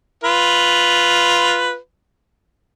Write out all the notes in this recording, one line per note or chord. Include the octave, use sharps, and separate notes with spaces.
F4 B4